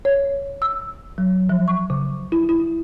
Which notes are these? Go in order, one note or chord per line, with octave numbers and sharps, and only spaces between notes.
C#5
E6
F#3
F3
C#6
C#3
E4
E4